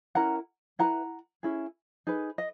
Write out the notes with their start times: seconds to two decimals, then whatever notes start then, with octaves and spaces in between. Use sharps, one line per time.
0.15 C#4 E4 A#4 F#5 A#5
0.79 E4 G#4 B4 F#5 A#5
1.43 C#4 E4 G#4
2.07 D#4 G#4 B4
2.38 D#5